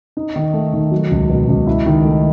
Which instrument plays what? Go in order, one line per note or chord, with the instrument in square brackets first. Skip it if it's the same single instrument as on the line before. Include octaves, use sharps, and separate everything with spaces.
[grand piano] D#4
D#3
A3
D#3
F#3
C#2
B2
C#2
E4
D#3
A3